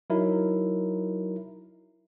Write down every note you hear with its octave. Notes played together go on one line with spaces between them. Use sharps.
F#3 D#4 E4 A#4